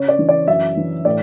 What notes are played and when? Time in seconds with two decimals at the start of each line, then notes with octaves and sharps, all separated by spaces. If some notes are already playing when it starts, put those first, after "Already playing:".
Already playing: C#3 C#5
0.08 D5
0.19 E3
0.29 D5
0.48 F#2 E5
0.77 E3
1.05 A2 D5